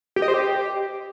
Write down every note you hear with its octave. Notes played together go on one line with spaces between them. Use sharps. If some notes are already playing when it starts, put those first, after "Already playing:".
G4
D#5
C5
G4